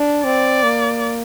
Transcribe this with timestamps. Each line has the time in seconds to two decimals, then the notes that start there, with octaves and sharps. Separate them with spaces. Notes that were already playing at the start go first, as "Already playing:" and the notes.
Already playing: D4
0.24 C4 D5
0.63 A#3